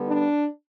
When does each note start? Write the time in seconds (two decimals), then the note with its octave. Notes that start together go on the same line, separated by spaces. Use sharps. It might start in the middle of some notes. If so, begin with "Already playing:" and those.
Already playing: D3 G3 B3
0.09 D4